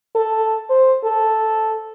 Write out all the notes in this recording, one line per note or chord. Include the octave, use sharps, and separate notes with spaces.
A4
C5
A4